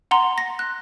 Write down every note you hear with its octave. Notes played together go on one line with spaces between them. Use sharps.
F#5 A#5 C6
A#6
F#6